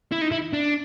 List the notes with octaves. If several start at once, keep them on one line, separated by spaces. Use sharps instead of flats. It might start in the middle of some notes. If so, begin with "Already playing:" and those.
E4
D#4
E4
D4